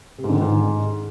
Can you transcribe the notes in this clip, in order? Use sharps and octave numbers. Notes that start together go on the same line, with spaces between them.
C3
G#2
D3
D#3
G#2